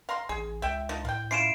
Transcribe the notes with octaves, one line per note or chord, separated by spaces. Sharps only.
F5 A#5 C6
A1 G#4
C#2 E5 G5
F3 D#4
A2 F5 G5
C#4 E4 F4 C7 D7 E7